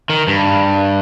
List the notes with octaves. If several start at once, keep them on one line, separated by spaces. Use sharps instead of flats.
D#3
G2